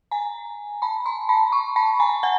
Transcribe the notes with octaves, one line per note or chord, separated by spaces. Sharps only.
G#5 A#5
A5 B5
A#5 C6
A5 B5
B5 C#6
A5 B5
G#5 A#5
F#5 G#5